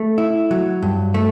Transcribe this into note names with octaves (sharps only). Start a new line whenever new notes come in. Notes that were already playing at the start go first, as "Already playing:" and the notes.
Already playing: A3
E4
F#3
G2
A3